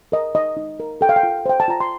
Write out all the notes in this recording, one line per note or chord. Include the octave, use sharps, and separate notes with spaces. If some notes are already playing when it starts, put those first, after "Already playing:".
A#4 D#5
D#4 D#5
D#4
A#4
A4 G5
F5
G5
F4
C5 G5
A5
F4 A#5
C6